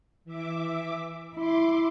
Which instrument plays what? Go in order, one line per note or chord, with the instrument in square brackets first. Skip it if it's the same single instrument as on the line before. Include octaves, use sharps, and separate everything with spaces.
[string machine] E3 E5 D6
[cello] E4 [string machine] C6 D6